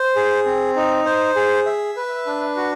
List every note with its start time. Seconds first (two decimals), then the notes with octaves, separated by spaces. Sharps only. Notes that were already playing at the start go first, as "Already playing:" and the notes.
Already playing: C5
0.16 G#4
0.46 C4
0.76 D#4
1.05 C5
1.36 G#4
1.66 E5
1.97 B4
2.27 D4
2.57 F#4